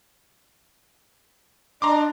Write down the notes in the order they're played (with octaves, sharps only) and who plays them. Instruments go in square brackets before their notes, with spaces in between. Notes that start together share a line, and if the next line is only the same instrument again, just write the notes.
[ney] D4 [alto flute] D#5 [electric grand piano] A#5 C6 D6